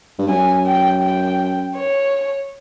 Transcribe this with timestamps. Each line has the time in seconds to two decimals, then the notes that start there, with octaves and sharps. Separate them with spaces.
0.19 G2
0.28 F#2 G#5
0.66 G5
1.02 G5
1.76 C#5